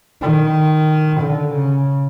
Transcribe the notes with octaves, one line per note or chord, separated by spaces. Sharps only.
D#3
D3
C#3